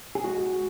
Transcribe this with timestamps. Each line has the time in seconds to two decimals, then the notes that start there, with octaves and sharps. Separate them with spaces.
0.15 G#4
0.24 G#3 F#4